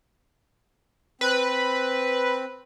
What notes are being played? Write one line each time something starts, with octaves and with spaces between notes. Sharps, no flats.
C4 B4